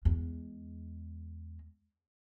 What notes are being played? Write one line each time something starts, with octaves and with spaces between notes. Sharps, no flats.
E2 G#3